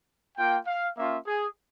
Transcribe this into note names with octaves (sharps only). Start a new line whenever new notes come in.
A#3 F4 G5
F5
A#3 C#4 F4 E5
G#4